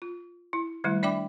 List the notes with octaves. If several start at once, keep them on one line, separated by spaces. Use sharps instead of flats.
F4
E4
D#3 G3 A3 E4
D4 D5 E5 G5 B5 D6